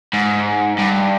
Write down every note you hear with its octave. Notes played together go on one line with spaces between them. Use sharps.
G#2
G2